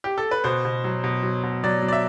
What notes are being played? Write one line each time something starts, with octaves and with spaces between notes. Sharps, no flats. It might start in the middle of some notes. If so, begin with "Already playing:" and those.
G4
A4
B4
B2 C5
B2
F#3
B2
F#3
B2
F#3 D5
F#3
D5
E5